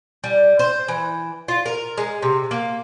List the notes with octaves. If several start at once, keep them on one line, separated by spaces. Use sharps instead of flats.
G3
C5
E3
F4
A#4
G#3
C3
A#3